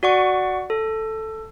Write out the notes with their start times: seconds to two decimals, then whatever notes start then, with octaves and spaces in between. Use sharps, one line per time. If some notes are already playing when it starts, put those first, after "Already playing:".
0.03 F#4 D5 F#5 C#6
0.70 A4